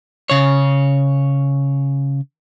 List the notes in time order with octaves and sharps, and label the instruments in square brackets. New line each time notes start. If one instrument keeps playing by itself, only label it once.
[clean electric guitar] C#3 C#5